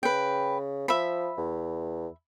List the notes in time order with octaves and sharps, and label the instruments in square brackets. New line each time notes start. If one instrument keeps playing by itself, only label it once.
[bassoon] C#3 [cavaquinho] B4 G5
[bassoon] F3 [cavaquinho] E5 B5
[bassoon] E2